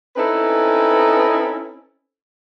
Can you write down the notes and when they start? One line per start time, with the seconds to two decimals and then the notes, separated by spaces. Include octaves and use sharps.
0.17 C4 C#4 D#4 E4 A4 B4